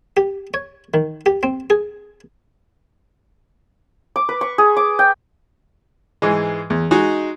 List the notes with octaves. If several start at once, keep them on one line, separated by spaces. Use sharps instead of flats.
G4
C#5
D#3
G4
C4
G#4
D6
B4
C#6
G#4
D6
G5
G#2 E3 G#3
E2
G#3 D#4 F#4